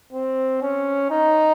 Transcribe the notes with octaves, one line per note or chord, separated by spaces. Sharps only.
C4
C#4
D#4